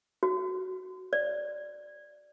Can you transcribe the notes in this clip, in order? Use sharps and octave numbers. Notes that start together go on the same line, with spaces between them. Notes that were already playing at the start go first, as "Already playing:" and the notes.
F#4
D5